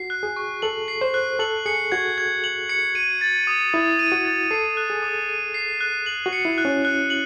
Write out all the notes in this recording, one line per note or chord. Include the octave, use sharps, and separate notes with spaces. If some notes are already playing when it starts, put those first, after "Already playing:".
Already playing: F#4 C7
F#6
G#4
C#6
A4 F#7
C7
C5
F#6
A4 F#7
G#4 C#7
F#4 G#6
G#6
F#7
C#7
D#7
A6
D#6
E4 D#6
D#7
F#4
A6
A4 C7
F#6
G#4
D#6
D#7
C7
F#6
F#7
F#4
C#7
E4
F#6
C#4
F#6
F#7